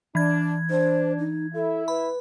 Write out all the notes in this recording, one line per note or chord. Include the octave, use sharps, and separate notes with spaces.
E3 D4 G#6
D4 C5
D#4
E4 A4 E5
B4 B5